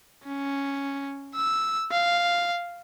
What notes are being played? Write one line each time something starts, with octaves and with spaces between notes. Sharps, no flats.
C#4
E6
F5